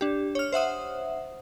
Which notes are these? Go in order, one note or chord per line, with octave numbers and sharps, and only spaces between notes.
D4 G4
C#5 F6
C5 E5 F#5 D#6